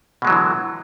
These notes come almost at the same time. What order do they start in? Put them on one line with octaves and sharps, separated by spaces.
B2 G#3 F#3 E3 D3